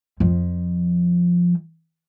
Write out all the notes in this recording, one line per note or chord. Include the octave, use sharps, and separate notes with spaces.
F2 F3